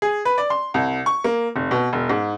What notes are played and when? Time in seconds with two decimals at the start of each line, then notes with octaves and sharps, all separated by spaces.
0.02 G#4
0.25 B4
0.38 D5
0.50 C6
0.74 C2
1.06 C#6
1.24 A#3
1.56 F1
1.71 B2
1.93 E1
2.09 G#2